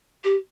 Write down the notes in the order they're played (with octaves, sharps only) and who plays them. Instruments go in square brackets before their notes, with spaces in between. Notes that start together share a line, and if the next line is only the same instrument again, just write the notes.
[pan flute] G4